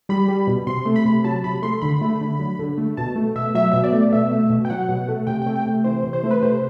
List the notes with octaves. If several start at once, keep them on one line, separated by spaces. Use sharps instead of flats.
G3 B5
G3
B2
C3 C6
A3
B5
C3
F#3 A5
C3 B5
A3 C6
D3 B5
A3
D3
F#3
D3
A3
B2 A5
A3
B2 E5
F#3 E5
B2 E5
D5
A3
B2 E5
A3
B2
G5
F#3 F#5
B2
A3
C3 G5
A3 G5
G5
C3
E3 C5
C3
C5
A3
B4
C3 C5